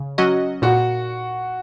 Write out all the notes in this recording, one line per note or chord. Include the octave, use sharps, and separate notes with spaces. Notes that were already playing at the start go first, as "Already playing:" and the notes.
Already playing: C#3
F#3 C#4 F#4 D#5
A#2 F#4